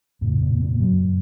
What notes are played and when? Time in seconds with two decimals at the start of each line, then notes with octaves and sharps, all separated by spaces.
0.21 F2 A2 C#3 A3
0.41 A#2 A#3
0.57 C4
0.61 A#2 A#3
0.80 F#2 F#3